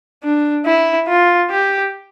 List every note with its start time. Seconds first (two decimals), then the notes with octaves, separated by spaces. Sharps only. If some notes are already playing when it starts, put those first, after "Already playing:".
0.23 D4
0.65 E4
1.07 F4
1.50 G4